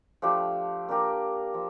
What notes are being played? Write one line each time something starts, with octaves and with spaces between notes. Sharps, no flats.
F3 A3 D4 G4
A#3 D4 G4 A#4
F3